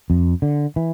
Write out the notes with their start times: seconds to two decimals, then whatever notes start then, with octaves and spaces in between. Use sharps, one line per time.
0.10 F2
0.42 D3
0.76 E3